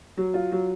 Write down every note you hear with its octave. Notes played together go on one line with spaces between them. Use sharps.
F#3
F4
F#3